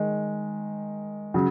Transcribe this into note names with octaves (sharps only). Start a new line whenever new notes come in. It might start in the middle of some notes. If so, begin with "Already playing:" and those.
Already playing: D#3 G#3
C#3 F#3